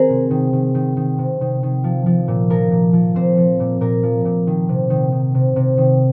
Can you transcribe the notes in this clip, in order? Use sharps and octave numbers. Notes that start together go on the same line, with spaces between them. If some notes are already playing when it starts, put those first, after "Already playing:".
Already playing: D#3 C4 G#4 A#4 C5
C3
D#3
D#3
D#3
D#3
C3
D#3
D#3
F3
F3
A#2
F3 A#4
A#2
F3
A#2 C4 C5
F3
A#2
A#2 A#4
F3
A#2
D#3
C3
D#3
D#3
C3
C3
D#3